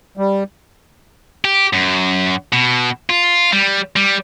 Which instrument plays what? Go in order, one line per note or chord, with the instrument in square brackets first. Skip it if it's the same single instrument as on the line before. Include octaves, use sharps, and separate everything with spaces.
[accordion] G3
[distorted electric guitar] G4
F#2
B2
F4
G3
G3